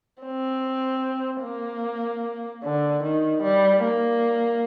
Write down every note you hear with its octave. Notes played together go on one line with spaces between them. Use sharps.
C4
A#3
D3
D#3
G3
A#3